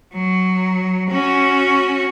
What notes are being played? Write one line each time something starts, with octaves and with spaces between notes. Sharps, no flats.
F#3
C#4 F#4